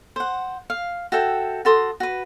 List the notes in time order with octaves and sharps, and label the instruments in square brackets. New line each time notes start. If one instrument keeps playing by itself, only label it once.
[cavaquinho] C5 F#5
F5
F#4 A4 E5 G5
F#4 A4 C6 D#6
F#4 B4